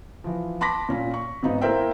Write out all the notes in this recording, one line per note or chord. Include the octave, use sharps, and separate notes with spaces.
E3 F3
A5 B5 C6 D6 A#6 B6
A#2 C#4 F4
C#6
G#1 B3 D#4
A#3 E4 A#4 C5 E5 G5